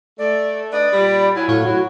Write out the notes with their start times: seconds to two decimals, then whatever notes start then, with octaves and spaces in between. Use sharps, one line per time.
0.18 A3 D5
0.72 D4 B4 D5 D#5
0.93 A#2 G3 B5
1.35 F#3 E4 G#5
1.48 A2 F#3 F4 C#5
1.65 F#3 F#4